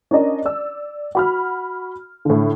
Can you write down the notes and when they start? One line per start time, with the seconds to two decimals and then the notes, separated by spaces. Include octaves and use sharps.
0.11 C#4 D4 A#4 D#5
0.45 D5 E6
1.15 F#4 B5 F6
2.25 A2 D3